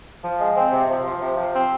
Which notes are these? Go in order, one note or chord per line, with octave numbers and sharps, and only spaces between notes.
F3
G#3
C4
C3
F3
F3
C3
F3
C4